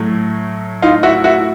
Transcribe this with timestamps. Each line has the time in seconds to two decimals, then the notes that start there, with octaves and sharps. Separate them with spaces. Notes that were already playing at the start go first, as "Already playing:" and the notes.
Already playing: A2 F#3 A3
0.82 D#4 F4
1.03 E4 F#4
1.24 E4 F#4